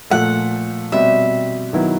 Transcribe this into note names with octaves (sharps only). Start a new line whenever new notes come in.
A#2 F3 A3 F#5
B2 G3 C4 E5
D#3 F#3 B3 E4